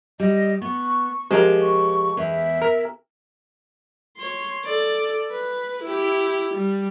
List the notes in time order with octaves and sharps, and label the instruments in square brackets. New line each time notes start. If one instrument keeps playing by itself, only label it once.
[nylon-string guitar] G3 [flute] D#5
[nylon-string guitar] B3 [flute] C#6
[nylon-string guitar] F3 G4 C5 [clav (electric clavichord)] G#3 A#4
[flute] C#6
[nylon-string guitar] E2 [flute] E5
[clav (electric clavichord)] A#4
[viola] C#5 C6
A4 D5
B4
E4 G4
G3